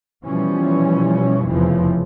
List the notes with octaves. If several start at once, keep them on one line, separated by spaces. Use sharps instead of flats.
B2 E3 F3 G3 C#4
F1 E2 C#3 E3 F3